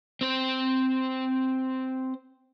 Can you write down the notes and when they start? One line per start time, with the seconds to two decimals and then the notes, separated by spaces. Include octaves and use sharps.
0.21 C4 C5